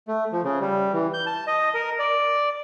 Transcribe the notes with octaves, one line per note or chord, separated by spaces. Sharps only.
A3
F3
C#3
G3
E3
G6
A5
D#5
A#4
D5